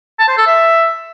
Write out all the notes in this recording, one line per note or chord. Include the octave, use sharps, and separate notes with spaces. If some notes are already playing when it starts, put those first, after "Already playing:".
A5
C5
A4
E5